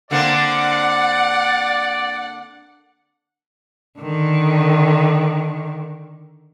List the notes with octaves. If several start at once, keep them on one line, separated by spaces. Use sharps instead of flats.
D3 A#3 C4 D5 F#5
D3 D#3